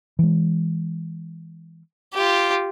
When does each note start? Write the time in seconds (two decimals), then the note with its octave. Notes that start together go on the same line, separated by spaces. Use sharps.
0.19 E3 G#3
2.14 F4 G4